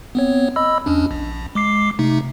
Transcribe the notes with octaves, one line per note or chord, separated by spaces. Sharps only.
B3 C4 C#5
D#5 B5 E6
E2 C#4 D4
A#1
G#3 D6 C7
C3 A3 D#4